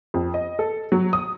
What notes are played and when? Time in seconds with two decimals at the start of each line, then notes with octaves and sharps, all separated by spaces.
0.14 F2
0.34 D#5
0.59 A4
0.92 F#3
1.13 D#6